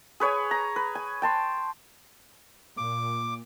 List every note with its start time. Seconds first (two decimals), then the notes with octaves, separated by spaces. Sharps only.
0.20 G#4 B4 C#5 G#5
0.51 A#5
0.76 B4
0.95 G#5
1.22 G5 A5 C6
2.77 A#2 D6